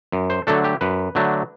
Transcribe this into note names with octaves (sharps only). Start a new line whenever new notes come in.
F#2
C5
D3 F#3 A3 D4 A4
G4
F#2 B4
D3 F#3 A3 D4